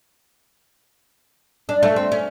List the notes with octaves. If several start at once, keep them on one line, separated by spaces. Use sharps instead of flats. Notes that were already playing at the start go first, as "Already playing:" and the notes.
D4
A3
C4
C#4